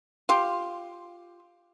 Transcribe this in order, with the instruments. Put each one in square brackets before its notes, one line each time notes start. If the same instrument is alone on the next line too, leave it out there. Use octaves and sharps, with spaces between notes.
[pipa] F4 G4